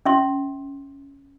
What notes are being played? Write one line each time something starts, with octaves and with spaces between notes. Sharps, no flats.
C#4 E5 C6